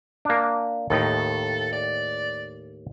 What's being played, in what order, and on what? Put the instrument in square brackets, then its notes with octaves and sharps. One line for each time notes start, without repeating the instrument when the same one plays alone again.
[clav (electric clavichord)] A#3 D4
[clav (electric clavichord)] D#2 A2 D#4 [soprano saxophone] A4
[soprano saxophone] D5